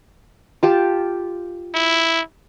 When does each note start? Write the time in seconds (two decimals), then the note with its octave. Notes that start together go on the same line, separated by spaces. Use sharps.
0.63 F4 G4 A5
1.74 E4